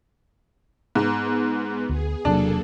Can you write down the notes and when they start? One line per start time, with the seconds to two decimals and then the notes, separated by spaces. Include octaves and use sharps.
0.95 G#2 B3
1.89 D2 G#4
2.25 E1 C3 F#3 A#3 D4 G#4 A4